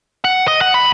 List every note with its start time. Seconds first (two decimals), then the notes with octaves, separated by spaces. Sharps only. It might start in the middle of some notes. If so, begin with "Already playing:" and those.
0.24 F#5
0.48 D#5
0.61 F#5
0.74 C2 B5